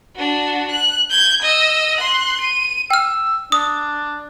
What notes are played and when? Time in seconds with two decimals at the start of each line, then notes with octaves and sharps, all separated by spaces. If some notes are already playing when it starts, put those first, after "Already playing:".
0.16 D4 F#4
0.71 F#6
1.10 G6 G#6
1.42 D#5 E6
1.97 C6 F#6
2.41 D#7
2.91 G5 E6 F6
3.52 D4 D#6